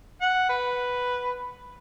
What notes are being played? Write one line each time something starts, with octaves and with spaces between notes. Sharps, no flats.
F#5
B4